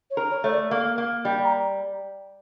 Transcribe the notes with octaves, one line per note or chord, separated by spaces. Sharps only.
C#5
A#4
C#5
A3 C#5
D5
A#3
A#3
G3
A#5